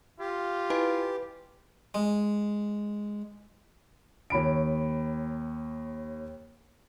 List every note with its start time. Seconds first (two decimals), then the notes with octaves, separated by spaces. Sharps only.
0.20 F4 G4
0.70 E4 B4 D#5 G#5
1.94 G#3
4.30 D#2 C#5 B5 D7